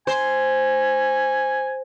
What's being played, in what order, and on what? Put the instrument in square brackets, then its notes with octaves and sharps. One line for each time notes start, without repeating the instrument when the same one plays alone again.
[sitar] C5 [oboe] G#5